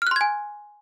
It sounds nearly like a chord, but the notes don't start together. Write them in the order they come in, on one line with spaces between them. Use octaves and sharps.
F6 F#6 C6 G#6 G#5